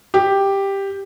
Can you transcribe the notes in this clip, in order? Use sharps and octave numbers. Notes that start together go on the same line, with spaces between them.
G4